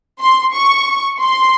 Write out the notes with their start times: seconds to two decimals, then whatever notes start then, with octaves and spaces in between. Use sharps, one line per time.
0.20 C6
0.54 C#6
1.21 C6